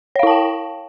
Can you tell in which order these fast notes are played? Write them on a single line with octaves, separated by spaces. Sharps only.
C#5 F5 E4 A5 G5